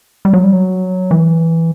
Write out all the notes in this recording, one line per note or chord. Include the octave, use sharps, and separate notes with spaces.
G3
F#3
G3
F#3
E3